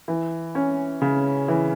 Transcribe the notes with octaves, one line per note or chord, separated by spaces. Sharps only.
E3
C#4
C#3
E3